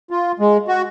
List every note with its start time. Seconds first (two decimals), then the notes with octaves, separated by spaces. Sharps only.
0.11 F4
0.40 G#3
0.68 F#4